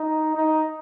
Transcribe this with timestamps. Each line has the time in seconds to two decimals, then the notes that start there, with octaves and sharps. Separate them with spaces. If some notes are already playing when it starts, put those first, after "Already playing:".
Already playing: D#4
0.35 D#4